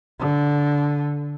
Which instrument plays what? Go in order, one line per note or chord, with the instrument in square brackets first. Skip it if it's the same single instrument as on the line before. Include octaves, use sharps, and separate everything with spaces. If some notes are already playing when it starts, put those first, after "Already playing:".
[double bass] D3